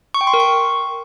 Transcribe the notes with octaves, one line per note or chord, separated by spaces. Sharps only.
C#6
G5
C6
A#4
C#6